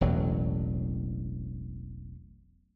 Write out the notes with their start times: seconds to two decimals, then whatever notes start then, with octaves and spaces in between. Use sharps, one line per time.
0.01 E1 A1 E2 F#3